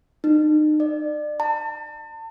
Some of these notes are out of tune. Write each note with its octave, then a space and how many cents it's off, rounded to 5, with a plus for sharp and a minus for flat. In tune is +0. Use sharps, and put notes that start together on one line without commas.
D#4 -35
D5 +30
A5 +35